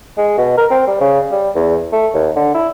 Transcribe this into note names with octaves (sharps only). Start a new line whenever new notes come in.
G#3
B2
A#4
C4
G3
C#3
G3
E2
A3
D#2
D3
E4